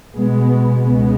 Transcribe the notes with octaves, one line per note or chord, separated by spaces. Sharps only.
B2 G#3 B3
C#2 C#3 G#3 B3